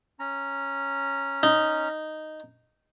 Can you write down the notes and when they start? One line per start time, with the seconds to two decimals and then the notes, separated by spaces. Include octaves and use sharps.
0.19 C#4 A#5
1.43 D#4